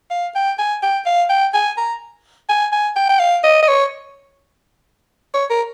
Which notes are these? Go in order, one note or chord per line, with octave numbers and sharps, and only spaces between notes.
F5
G5
G#5
G5
F5
G5
G#5
A#5
G#5
G#5
G5
G5
F5
D#5
D#5
C#5
C#5
A#4